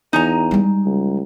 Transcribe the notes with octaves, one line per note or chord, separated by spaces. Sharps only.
E2 D#4 G#5 A#5
G3 G#3
C#2